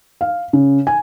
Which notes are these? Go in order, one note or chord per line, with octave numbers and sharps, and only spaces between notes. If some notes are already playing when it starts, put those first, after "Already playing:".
F5
C#3
G#5